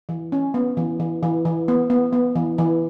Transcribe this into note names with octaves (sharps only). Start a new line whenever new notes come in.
E3
C#4
B3
E3
E3
E3
E3
B3
B3
B3
E3
E3